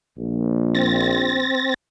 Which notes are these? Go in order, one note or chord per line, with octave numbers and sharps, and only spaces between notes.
A#1
C4 A6 A#6